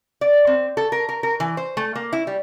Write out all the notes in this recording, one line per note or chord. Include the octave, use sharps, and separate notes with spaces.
D5
C4
A4
A#4
A#4
A#4
E3
C5
A3
A#3
E4
G3